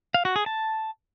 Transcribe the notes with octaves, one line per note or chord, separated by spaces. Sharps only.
F5
F#4
G#4
A5